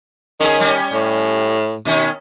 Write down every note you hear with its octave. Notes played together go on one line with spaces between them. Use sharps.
D#3 C#4 G#4
G3 C#4
A2
B2 D#3 C#4